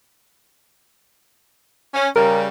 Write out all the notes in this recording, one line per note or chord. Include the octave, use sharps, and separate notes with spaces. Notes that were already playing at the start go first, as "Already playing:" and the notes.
C#4
C#3 G3 A#4